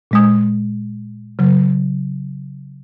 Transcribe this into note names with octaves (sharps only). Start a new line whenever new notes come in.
A#2 G#3 D#6
C#3 F#3